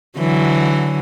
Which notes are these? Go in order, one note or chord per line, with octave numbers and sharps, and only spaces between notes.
D3 E3 F#3